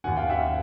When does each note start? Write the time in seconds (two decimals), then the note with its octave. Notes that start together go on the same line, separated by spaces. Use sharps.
0.04 D#2 D#3 F#5 G#5
0.17 F5 G5
0.30 E5 F#5